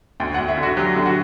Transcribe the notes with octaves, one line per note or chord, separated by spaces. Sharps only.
D2 G5
F#5
D2
E5
D3
F#4
F#3 G4
D3
F#4